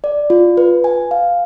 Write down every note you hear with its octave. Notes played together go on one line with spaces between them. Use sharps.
D5
F4
B4
G#5
F5